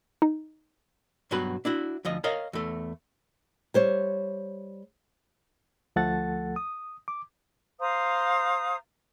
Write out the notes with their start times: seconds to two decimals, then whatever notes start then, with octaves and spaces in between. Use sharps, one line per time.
0.22 D#4
1.31 G2 B2 F#3 F#4 B4 B5
1.65 D4 E4 F#4
2.05 D2 F3 D#5
2.24 A#4 C#5 D#5 F5
2.53 E2 A3
3.74 G3 C5 C#5
5.96 D2 F3 A3 A4 F#5 A6
6.56 D#6
7.08 D6
7.80 C5 F5 A#5 D#6